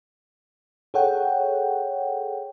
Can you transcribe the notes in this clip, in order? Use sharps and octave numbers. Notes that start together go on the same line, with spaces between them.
G#4 A4 C#5 F#5 G5